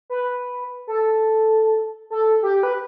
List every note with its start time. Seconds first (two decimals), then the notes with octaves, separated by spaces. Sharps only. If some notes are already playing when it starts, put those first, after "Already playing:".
0.10 B4
0.87 A4
2.10 A4
2.43 G4
2.63 B4